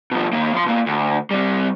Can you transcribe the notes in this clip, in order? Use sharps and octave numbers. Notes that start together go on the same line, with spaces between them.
B2 F3
D#3 A#3
F3 C6
B2 A#3
D2
C3 G3